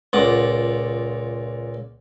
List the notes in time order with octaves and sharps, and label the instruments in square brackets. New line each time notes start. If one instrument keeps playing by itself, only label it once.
[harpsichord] C#2 A#2 F#5 D6